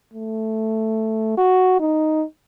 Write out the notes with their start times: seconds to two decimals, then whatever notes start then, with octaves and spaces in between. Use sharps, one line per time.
0.14 A3
1.38 F#4
1.80 D#4